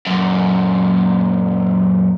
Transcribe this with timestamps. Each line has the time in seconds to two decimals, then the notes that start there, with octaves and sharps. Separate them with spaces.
0.07 F#2 A#2